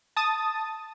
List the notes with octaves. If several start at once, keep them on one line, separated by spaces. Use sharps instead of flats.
A5 D#6 A6